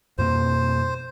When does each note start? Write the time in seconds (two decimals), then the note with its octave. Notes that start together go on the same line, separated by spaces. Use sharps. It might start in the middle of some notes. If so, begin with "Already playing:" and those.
0.18 F2 B2 A#3 C5